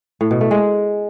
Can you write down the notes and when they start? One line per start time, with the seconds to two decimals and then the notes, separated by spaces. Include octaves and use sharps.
0.21 A2
0.31 B2
0.41 A3
0.51 G#3